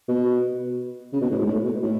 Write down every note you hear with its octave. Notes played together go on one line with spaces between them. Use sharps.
B2
C#3
B2
A2
G#2
A2
B2
A2